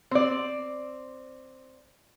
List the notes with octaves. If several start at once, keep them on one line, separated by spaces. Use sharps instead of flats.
C4 D5